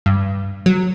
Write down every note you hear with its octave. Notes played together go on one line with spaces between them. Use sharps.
G2
F#3